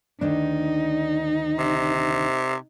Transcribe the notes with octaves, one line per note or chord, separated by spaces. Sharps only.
D2 D#3 D4 D#4
C3